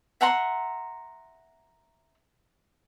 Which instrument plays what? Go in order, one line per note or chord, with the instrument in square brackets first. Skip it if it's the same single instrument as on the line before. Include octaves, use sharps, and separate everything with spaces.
[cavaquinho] E5 F#5 A#5 C6